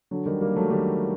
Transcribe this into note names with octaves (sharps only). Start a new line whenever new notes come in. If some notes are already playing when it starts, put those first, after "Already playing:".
D3 F#3
D#3 G3
G3 A#3
F#3 A3
D#3 G3